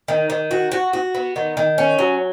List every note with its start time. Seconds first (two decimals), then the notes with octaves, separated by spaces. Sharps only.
0.08 D#3
0.30 D#3
0.51 F#4
0.72 F#4
0.93 F#4
1.15 B3
1.36 D#3
1.57 D#3
1.78 C#4
1.99 F#3